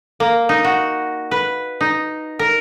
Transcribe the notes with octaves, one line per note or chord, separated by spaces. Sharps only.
A#3
D#4
F#4
B4
D#4
A#4